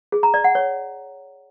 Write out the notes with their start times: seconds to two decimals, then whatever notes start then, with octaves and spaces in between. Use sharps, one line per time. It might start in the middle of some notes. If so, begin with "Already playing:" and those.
0.12 G#4
0.23 A#5
0.34 D5
0.44 F#5
0.55 C#5